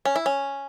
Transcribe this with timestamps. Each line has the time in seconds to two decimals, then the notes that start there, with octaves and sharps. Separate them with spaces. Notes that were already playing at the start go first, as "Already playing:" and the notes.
0.05 C#4
0.16 E4
0.26 C#4